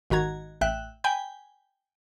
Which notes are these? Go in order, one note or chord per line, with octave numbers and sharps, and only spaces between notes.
G#1 D#3 F#4 A#5 G#6
A1 E5 G5 F#6
G5 G#5 B5 G6